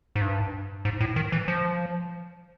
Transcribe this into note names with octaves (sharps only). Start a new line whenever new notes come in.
G#2
G2
G#2
A2
D#3
E3
F3